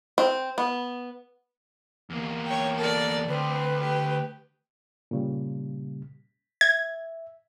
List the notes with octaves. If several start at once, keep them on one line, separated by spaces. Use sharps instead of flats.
C4
B3
E2 A#3
C#5 G5
A4 A#4 D5
D2 C4 B4
G4
A#2 C#3 G3
E5 G#6